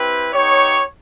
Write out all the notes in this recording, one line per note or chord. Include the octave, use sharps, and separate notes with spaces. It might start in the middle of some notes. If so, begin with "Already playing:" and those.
Already playing: C4 E4 G4 B4
B3 D#4 G4 C#5